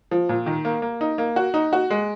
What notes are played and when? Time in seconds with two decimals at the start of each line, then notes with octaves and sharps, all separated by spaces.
0.11 F3
0.29 A#2
0.46 D#3
0.65 A#3
0.82 A#3
1.01 D#4
1.18 A#3
1.36 F#4
1.54 D#4
1.73 F#4
1.90 G#3